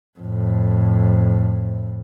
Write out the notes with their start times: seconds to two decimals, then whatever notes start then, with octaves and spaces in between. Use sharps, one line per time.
0.19 F2 A2